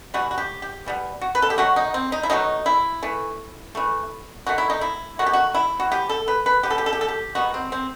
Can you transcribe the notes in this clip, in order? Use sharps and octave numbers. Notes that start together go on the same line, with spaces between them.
E3 G3 B3 F#4
F#4
G4
G4
E3 G3 B3
F#4
B4
A4
G4
B2 F#3 A3 F#4
D#4
C4
D#4
E4
B2 F#3 A3 D#4
E4
E3 A3
E3 A3
D#3 A3 F#4
E4
D#4
E4
D#3 A3 F#4
G4
F#4
E4
F#4
E3 B3 G4
A4
B4
B4
E3 B3 G4
A4
G4
A4
G4
A4
G4
D#3 G3 B3 F#4
C4
C4